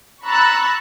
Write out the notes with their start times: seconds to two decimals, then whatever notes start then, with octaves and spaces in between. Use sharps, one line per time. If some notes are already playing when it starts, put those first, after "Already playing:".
0.24 A#5 B5 C#6 E6 F#6 A6